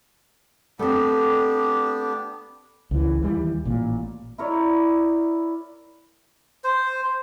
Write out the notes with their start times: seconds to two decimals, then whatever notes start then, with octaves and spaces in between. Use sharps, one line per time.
0.79 A3 B3 C4 D4 G4
2.91 C#2 E3
3.22 D#2 E3 G3
3.65 A1 A#2
4.38 E4 A#4 C#5 D5
6.64 C5